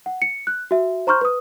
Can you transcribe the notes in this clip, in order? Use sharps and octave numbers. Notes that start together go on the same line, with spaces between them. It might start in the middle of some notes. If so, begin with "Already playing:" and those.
F#5
C#7
F#6
F#4 E5
C5 A#5 C6 C#6 F6 G6
B4 D#6